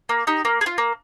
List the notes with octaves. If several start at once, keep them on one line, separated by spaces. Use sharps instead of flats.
A#3
D#4 G4
A#3
G#4
F4
A#3